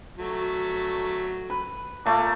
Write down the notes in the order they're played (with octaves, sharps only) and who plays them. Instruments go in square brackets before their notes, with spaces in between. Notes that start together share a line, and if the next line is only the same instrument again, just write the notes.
[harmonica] F#3 A3
[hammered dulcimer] B4
[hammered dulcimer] A#2 A3 [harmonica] A#5 D6